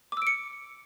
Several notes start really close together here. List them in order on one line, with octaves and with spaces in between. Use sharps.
D6 E6 D7 C#7